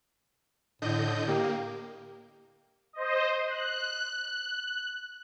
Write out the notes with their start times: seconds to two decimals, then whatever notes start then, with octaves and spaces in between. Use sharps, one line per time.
0.82 A2 D3 D#5 G6
1.28 A#3 G4
2.93 C5 D#5
3.47 F#6